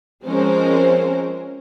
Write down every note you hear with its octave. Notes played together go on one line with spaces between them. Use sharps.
F3 G#3 C4 C#4 A#4 C5